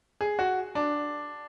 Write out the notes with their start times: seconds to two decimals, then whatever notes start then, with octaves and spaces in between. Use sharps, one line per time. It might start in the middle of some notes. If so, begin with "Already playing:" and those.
0.21 G#4
0.39 F#4
0.75 D4